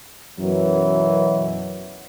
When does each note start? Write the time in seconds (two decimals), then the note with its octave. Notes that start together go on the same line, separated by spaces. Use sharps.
0.39 F#2 B2 E3 F#3